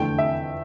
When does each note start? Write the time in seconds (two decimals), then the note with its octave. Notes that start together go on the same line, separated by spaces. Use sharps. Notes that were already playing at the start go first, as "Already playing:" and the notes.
Already playing: F1 E2 D3 A3 G5
0.18 E5